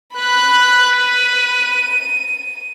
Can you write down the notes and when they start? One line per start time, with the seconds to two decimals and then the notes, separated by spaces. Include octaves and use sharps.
0.17 B4 B5 F#6
0.99 D#7